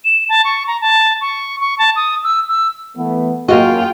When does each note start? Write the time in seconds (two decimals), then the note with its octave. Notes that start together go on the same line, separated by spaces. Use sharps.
0.05 E7
0.29 A5
0.44 C#6
0.67 A#5
0.81 A5
1.21 C#6
1.61 C#6
1.79 A5
1.96 D#6
2.24 E6
2.48 E6
2.97 E3 A3 B3
3.48 F#2 A#3 F4 F#4 G#4 D#5 G5